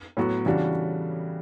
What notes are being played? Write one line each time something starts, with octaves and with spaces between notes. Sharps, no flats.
A2 F#3 B3 F#4
C#3 E3 G3 D4 F#4